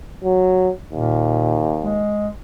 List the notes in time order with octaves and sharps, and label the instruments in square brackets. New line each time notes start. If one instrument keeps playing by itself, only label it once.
[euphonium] F#3
[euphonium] D#2 [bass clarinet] A#2
[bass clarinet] G#3